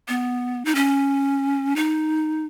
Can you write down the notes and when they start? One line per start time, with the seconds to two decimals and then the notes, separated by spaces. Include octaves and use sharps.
0.08 B3
0.65 D#4
0.75 C#4
1.76 D#4